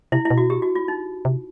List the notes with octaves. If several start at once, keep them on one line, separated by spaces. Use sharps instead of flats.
C3 E4
E4
B2
F#4
G4
F#4
F4
D#4
C3